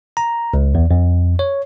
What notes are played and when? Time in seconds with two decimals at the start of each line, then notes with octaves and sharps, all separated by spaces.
0.17 A#5
0.54 C#2
0.75 E2
0.91 F2
1.39 C#5